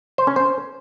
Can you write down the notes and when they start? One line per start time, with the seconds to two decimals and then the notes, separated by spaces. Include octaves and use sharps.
0.18 C5
0.27 C#4
0.36 C5